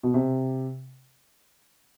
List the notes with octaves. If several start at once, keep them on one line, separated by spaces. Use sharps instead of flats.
B2
C3